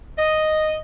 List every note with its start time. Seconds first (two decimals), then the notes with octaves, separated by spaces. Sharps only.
0.16 D#5